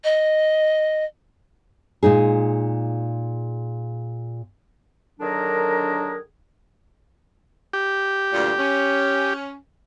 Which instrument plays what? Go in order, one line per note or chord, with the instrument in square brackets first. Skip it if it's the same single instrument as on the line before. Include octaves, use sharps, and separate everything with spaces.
[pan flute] D#5
[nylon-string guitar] A#2 G#3 D#4 G#4
[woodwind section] D3 D#3 F#3 D4 G#4 A#4
[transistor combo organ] G4
[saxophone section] D2 G2 A#2
C#4